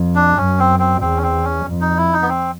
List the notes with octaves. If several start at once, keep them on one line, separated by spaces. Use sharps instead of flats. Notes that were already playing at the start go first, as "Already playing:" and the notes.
Already playing: F2
D4
F#2 C#4
C4
C4
E2 C4
C#4
C4
C#4
F2
D#4
E4
D#4
B3
C4